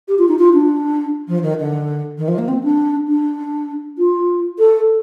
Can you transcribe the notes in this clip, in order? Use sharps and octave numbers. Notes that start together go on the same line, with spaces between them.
G4
F4
D#4
F4
D4
F3
D#3
D3
D#3
F3
A#3
C4
D4
D4
F4
A4